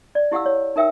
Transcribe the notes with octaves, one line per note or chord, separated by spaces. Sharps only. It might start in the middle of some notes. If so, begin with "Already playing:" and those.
D5
E4 G4 F5 F#5 E6
C#5
D#4 A#4 E5 G5 E6